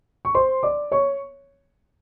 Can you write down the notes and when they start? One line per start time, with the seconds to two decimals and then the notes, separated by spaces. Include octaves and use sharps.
0.25 C#6
0.35 C5 C6
0.63 D5 D6
0.91 C#5 C#6